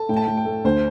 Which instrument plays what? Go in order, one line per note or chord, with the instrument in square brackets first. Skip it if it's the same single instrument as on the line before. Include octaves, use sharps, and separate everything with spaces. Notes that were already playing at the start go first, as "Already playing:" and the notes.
Already playing: [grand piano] A4 A5
[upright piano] A2 [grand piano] G5
[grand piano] A5
[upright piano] A2 [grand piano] G5
[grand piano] G5
[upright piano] A3
[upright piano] D2 [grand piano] C5